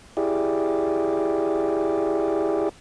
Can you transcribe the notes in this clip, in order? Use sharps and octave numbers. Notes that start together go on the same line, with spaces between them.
E4 G4 G#4 D5